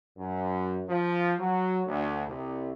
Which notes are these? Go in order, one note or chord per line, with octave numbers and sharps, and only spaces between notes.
F#2
F3
F#3
D2
C2